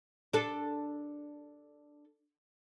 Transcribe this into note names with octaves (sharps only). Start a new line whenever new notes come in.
D4 A4